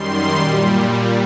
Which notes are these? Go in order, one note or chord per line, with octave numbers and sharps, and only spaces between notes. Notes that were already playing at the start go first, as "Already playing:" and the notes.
Already playing: F#2 D#3 G3 C6
A#2 G3